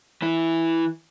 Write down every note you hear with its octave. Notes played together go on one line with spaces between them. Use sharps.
E3 E4